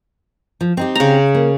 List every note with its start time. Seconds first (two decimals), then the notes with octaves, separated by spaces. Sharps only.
0.61 F3
0.77 C4 D#4 G4
0.95 C#3 A#5
1.35 A#3